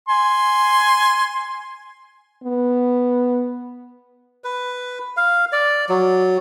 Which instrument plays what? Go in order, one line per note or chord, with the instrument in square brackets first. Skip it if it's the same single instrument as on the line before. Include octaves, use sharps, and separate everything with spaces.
[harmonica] G#5 C6
[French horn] B3
[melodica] B4
F5
D5
F#3